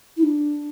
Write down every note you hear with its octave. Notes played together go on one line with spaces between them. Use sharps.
E4
D4